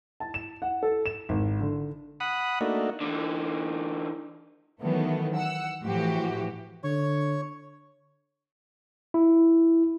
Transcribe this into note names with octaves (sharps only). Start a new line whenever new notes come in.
A5
E7
F#5
A4
E7
G#1
D3
F#5 B5 D#6
A3 A#3 D4 D#4 F#4
D3 E3
D#3 E3 F#3 A3 B3
F#5 E6
A2 E3 F3 F#4 G4
D3 C#5 C#6
E4